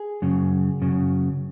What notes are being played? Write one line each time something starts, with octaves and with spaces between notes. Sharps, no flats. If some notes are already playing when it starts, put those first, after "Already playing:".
Already playing: G#4
F#2 C#3
F#2 C#3